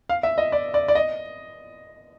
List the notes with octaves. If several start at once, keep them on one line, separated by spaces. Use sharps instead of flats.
F5
E5
D#5
D5
D5
D5
D#5